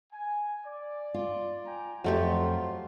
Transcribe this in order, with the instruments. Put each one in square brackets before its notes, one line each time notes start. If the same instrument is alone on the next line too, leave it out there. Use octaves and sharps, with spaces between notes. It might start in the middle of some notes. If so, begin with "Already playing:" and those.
[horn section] G#5
D5
[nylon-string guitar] F4
[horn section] G5 G#5 A#5
[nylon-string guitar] F2 [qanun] F#3 A3 G4 [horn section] F4 C6